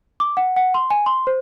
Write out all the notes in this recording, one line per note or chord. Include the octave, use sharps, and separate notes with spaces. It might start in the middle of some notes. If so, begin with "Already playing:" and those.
D6
F#5
F#5
C6
G#5
C6
C5